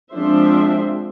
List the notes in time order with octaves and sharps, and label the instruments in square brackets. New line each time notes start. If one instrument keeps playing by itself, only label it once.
[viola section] F3 G#3 C4 D4 C5 E5